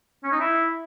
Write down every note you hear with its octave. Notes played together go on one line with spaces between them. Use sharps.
C#4
D#4
E4